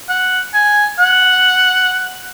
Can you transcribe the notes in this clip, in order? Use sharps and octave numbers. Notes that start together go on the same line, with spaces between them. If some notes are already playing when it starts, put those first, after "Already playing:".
F#5
G#5
F#5